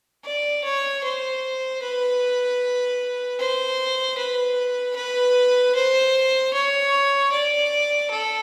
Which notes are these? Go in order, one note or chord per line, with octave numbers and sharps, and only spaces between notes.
D5
C#5
C5
B4
C5
B4
B4
C5
C#5
D5
A4